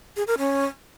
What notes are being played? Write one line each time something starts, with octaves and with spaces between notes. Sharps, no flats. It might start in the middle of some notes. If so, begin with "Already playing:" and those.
G#4
A#4
C#4